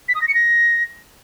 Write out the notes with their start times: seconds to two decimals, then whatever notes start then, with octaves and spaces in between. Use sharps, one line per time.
0.09 B6
0.15 D#6
0.22 A#6
0.28 C#7
0.34 A#6